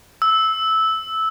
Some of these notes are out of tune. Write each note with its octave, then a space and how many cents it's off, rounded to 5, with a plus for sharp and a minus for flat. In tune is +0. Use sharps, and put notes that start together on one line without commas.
E6 -15